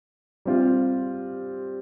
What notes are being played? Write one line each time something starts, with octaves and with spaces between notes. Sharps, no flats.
G3 C4 F4